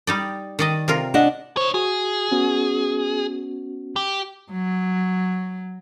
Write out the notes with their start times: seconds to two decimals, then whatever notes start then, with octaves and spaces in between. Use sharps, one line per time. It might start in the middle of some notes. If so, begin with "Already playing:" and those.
0.07 G3 D#4 D5
0.59 D#3 D5 D#5
0.88 C3 F4 A#4
1.14 D4 D#5 F#5
1.57 D#4 C5 C#5
1.74 F#4 G#4
2.32 B3 C#4 F#4
3.96 G4
4.51 F#3